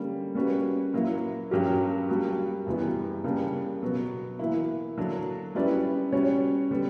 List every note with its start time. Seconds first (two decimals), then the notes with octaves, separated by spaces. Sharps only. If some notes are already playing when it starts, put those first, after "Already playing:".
Already playing: D3 G3 A#3 C#4
0.35 G3 A#3 C#4 F#4 B4
0.94 A#2 F#3 A#3 E4
1.51 G2 F#3 C#4 G4 A#4
2.09 G3 A#3 D4 F#4
2.66 F#2 C#3 E3 G3 B3
3.24 C#3 G3 A#3 D4
3.82 B2 F#3 B3 F#4
4.39 E3 A#3 E4
4.98 D3 F#3 A#3 D4
5.55 G3 C#4 E4 B4 D5
6.12 G3 C#4 F#4 C#5
6.70 D3 G3 B3